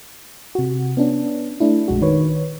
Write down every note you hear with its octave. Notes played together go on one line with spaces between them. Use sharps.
C3 F#4
B3 C#4 D4
A3 D4 E4
A#1 F2 G#3 F#4
D#3 B4 C#5